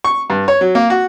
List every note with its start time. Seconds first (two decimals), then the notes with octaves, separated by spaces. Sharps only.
0.04 C#6
0.30 G2
0.48 C#5
0.61 F#3
0.75 A#3
0.90 F#4